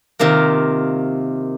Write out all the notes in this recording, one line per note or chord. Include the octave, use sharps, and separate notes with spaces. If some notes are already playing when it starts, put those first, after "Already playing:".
C3 D#3 A#3 F4